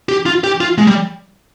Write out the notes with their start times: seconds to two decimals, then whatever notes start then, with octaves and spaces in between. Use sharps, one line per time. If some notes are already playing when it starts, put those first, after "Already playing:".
0.09 G4
0.26 F4
0.44 G4
0.61 F4
0.78 G#3
0.87 G3